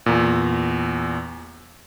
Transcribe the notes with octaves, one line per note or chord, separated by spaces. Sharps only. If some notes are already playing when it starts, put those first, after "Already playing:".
E2 A#2